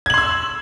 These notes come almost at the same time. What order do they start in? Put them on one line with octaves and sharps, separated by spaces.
G#6 F#7 C6 E6